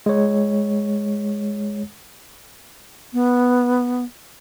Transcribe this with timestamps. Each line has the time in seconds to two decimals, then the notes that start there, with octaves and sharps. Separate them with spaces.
0.06 G#3 C#5
3.13 B3